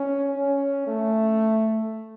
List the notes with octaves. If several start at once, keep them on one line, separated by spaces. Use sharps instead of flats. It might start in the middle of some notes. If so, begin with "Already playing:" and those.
Already playing: C#4
C#4
A3